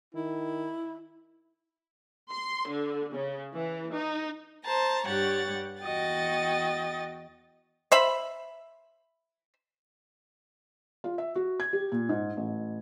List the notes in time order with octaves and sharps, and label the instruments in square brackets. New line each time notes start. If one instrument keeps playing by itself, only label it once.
[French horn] D#3 [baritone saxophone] E4
[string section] C6
D3
C#3
E3
D#4
[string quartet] C5 A5 A#5
G2 G4 C#5 F#5 A6
E2 F#4 D#5 G5 A6
[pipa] C5 E5 B5
[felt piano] F4
E5
F#4
G#6
G4
A#2
G#2
A1